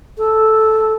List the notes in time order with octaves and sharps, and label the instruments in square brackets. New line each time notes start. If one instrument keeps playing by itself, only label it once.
[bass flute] A4